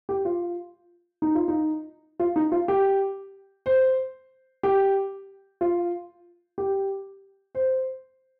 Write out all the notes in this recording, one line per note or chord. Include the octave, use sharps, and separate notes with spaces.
G4
F4
D#4
F4
D#4
F4
D#4
F4
G4
C5
G4
F4
G4
C5